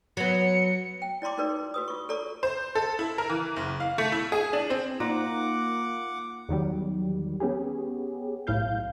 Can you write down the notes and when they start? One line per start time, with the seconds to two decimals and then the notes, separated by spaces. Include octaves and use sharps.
0.17 F#3 B3 C#7
1.02 G5
1.22 E4 D5 A#5 C6 D6
1.38 D#4 F#4 A#4 B4 D5
1.74 F#4 B4 D#6
1.88 F4 C#6
2.09 A4 A#4 D5 A#5 C#6
2.43 C5
2.75 A4
2.99 E4
3.18 A#4
3.30 E3
3.56 F#1
3.80 F5
3.98 A3
4.12 E4
4.32 G#4
4.53 D4
4.70 C4
5.00 A#3 D#4 F4 F#5 D6
6.49 E2 D#3 F#3 G3
7.40 B3 C#4 G4 G#4
8.47 B1 A2 E4 F5 G6